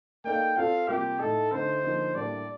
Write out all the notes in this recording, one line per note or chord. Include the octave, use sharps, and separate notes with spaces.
A#3 D#4 A4 D5 F5 G5
C4 F4 A4 D5 F5
C3 G3 A#3 F4 G4 A#4
A2 A3 D#4 A4
D3 A3 D#4 C5
D3 F3 A#3 D#4
A2 G3 A#3 D4 G4 D5